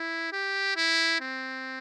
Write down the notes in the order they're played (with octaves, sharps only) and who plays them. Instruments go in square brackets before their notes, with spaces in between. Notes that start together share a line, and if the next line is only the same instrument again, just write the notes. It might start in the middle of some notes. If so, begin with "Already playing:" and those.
Already playing: [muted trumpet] E4
G4
E4
C4